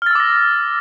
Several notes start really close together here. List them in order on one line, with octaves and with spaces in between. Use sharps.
F6 A6 E6 D6 A#6